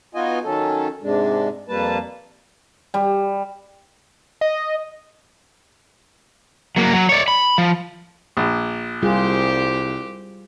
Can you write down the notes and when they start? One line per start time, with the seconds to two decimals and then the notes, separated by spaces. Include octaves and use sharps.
0.15 B3 D#4 F4 F#4 D#5 G#5
0.44 D#3 F#3 C#4 A4
1.02 G#2 C3 G#3 D4
1.68 F2 G3 A#3 B4 A5
2.94 G3
4.41 D#5
6.76 F#3 A#3
6.93 F#3
7.09 C#5 D5
7.28 B5
7.58 F3
8.37 A#1
9.03 C2 G3 F4 G4 G#4 C5